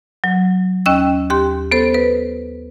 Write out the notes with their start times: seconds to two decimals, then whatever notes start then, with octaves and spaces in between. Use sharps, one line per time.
0.24 F#3
0.86 D#2 C#4 D#5 G5 E6
1.30 D#2 G4 C6
1.72 B3 A4 C5
1.94 B4